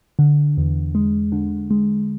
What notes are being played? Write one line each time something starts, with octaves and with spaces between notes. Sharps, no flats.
D3
E2
G#3
D3
G#3